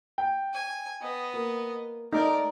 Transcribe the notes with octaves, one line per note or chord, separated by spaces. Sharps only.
G5
G#5
B3 D#5
A#3
A3 D#4 A#4 D5